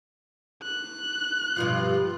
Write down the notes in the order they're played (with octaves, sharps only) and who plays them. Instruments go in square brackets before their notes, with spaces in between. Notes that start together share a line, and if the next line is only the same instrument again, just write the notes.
[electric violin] F#6
[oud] G2 B2 F3 [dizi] F4